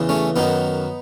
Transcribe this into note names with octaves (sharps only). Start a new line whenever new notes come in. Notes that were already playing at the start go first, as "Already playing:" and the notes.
Already playing: E2 C#3 E3
A3 C#4
F#2 D#3 F#3 B3 D#4